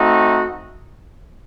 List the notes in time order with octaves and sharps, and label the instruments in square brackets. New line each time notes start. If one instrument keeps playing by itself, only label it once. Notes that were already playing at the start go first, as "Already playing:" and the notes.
Already playing: [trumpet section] A3 C4 D#4 F#4